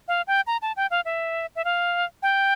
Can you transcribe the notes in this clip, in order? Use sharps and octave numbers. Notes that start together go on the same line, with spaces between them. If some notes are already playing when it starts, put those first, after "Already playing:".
F5
G5
A#5
A5
G5
F5
E5
E5
F5
G5